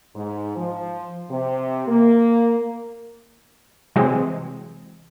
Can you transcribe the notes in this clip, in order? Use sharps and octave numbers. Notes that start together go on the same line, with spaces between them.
G#2
F3
C3
A#3
C3 E3 F#3 G#3 C4